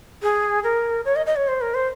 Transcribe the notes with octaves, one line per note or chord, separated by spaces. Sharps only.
G#4
A#4
C#5
D#5
D#5
C#5
C5
A#4
C5